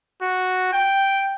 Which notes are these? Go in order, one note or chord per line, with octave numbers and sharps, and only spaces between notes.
F#4
G5